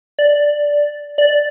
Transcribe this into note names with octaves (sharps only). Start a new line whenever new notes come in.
D5
D5